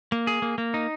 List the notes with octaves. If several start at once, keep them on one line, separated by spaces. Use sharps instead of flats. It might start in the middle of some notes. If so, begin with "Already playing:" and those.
A#3
G#4
A#3
A#3
D#4